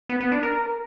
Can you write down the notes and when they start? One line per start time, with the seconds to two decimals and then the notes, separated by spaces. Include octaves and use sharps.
0.09 B3
0.21 B3
0.32 D4
0.43 A#4